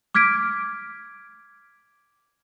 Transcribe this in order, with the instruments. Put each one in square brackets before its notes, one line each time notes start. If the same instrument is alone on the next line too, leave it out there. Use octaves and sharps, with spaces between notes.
[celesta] D6 F6 G#6 B6 D7